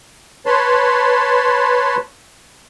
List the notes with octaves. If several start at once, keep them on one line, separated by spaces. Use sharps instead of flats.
B4 C#5 A5 B5 C6